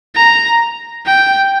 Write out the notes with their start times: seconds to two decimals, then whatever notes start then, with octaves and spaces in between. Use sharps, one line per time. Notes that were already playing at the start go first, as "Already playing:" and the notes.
0.16 A#5
1.06 G5